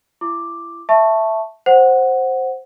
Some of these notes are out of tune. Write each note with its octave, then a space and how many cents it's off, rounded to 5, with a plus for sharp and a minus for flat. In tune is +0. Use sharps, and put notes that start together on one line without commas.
E4 +35 D6 +0
E5 +0 A5 +0 C#6 -10
C5 +5 F#5 +0